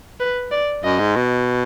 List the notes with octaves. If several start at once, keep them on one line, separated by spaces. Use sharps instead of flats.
B4
D5
F#2 D#5
G#2
B2